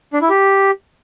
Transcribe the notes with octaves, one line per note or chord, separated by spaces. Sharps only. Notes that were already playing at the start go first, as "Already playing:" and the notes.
D4
E4
G4